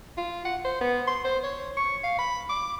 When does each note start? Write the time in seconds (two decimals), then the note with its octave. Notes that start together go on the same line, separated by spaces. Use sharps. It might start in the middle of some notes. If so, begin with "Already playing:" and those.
0.18 F4
0.45 F#5
0.65 C5
0.81 B3
1.08 C6
1.24 C5
1.43 C#5
1.77 C#6
2.04 F5
2.18 B5
2.49 D6